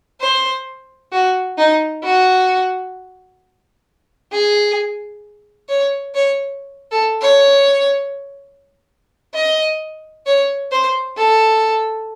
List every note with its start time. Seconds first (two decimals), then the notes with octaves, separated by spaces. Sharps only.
0.21 C5
1.12 F#4
1.58 D#4
2.04 F#4
4.32 G#4
5.69 C#5
6.15 C#5
6.91 A4
7.21 C#5
9.35 D#5
10.26 C#5
10.72 C5
11.17 A4